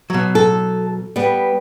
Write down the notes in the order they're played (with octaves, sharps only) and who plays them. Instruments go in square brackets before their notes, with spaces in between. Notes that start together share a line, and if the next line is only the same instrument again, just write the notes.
[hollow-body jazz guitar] B2 F#3
[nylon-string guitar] A4
G3 B3